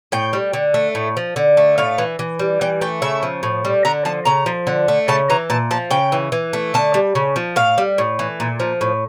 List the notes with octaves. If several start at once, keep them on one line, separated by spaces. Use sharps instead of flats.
A2 G5
G3
D3
A3
A2
F3
D3
A3
A2 F5
E3
E3
G3
E3 G5
A3 G5
C#3 E5
F3
A2
G3
D3 A#5
F3 A5
C#3 A#5
F3
D3
A3
C#3 A5
E3 A#5
A#2 A5
F3 A5
C#3 G5
E3
E3
A3
D3 A5
G3
C#3
F3
A2 F5
G3
A2
E3
A#2
F3
A2